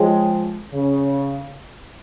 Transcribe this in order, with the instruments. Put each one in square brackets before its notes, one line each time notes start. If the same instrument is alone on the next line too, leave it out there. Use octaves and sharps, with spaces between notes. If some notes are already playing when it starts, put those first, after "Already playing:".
Already playing: [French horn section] F3 G#3 [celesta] C#5 G5
[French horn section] C#3